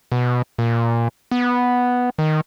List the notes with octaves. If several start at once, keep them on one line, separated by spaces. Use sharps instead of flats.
B2
A#2
B3
D#3